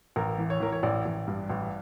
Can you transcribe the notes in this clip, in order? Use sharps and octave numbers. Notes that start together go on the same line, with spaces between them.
A1 A#4
E3
C#5
E3 A#4
C#5
A1 D5
A1
G2
A1